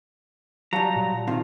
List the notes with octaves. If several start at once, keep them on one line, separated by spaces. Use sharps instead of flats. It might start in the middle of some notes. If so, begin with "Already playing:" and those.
F#3 G3 F5 A5 A#5
A#2
C3 D#3 F4